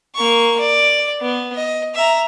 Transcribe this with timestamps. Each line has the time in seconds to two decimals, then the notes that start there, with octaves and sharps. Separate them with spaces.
0.15 A#3 C#6
0.59 D5
1.21 B3
1.56 D#5
1.94 E5 A#5